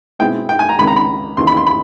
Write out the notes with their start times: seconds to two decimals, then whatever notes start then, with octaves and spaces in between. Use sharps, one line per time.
0.19 B2 G#3 C4 E4 G5
0.49 G5
0.59 G#5
0.69 A#5
0.78 C#2 C3 D#3 B5
0.87 A#5
0.96 B5
1.37 D#2 C#3 E3 C6
1.47 B5
1.57 C6
1.66 B5